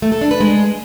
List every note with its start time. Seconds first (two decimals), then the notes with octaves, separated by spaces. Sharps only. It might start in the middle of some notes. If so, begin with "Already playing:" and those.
0.02 A3
0.12 A4
0.21 D4
0.31 B4
0.40 G#3